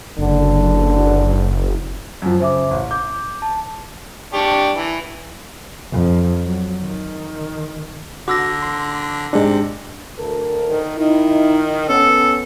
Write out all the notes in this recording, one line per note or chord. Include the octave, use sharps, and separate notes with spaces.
F#1 D3
F#2 F3
C#3 C5 E5 D6
A1
D6 G6
A5
D4 G4 C#6
E3
F2
F#3
D#3
D3 F#4 D6 E6 A#6
C6
G#2 C3 G#3 D4
D2 A4 A#4
D#3
D#3 D#4 E4
B3 C#4 A4